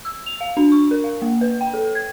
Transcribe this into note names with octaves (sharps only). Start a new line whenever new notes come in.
E6
F7
F5
D4
C#6
A#4
F5
A#3
B4
G5
A4
G#6